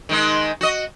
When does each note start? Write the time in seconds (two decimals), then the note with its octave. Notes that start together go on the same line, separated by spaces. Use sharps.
0.09 D#3 G#3 D#4
0.61 F#4 D#5